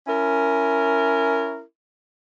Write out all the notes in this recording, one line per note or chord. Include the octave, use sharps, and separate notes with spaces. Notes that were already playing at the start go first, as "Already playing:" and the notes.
C#4 E4 A#4